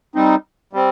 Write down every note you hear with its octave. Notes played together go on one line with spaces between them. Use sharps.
G3 C4 D#4
G3 C4